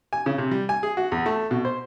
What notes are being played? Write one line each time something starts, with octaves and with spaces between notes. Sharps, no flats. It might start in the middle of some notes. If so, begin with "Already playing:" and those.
G#5
C#3
C3
G3
G#5
G#4
F#4
E2
A3
B2
C5